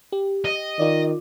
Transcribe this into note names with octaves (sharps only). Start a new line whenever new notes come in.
G4
D#5
D#3 F4 D5